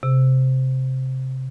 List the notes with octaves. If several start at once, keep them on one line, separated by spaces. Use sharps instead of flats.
C3